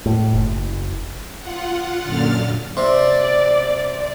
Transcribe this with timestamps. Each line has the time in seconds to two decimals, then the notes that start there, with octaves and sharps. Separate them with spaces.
0.06 A2
0.33 F#1
1.40 F4 F#5
2.03 F#2 A#2 D3 F6 A6
2.77 C3 D5